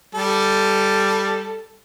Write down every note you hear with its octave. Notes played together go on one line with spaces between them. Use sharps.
G3 A4